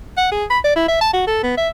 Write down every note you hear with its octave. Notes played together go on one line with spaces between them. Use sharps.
F#5
G#4
B5
D5
E4
E5
A5
F#4
A4
B3
E5